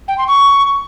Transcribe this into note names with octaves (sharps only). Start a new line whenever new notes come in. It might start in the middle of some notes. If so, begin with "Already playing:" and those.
G5
C6
C#6